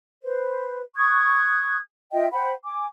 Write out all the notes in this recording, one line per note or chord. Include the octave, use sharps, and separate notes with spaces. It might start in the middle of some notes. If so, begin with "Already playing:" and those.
B4 C5
C#6 D#6 F#6 G#6
F4 D#5 E5 G5
C5 F#5 G5 B5
G#5 D6